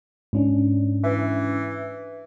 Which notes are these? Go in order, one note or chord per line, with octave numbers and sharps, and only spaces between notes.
G#2 C#4 D4
E3